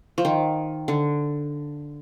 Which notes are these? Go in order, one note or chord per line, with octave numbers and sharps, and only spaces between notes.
F3
D#3
D3